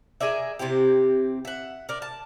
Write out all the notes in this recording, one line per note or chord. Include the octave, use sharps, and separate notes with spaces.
G#4 A#4 D5 E5
C3 C4 E4 G4
E5 F#5
D4 A#4
A5